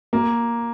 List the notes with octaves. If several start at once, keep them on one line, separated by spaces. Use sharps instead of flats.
A#3